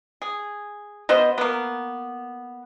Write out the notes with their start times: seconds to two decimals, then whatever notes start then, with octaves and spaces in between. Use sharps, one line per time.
0.22 G#4
1.09 B2 B3 C5 D#5
1.38 A#3 B3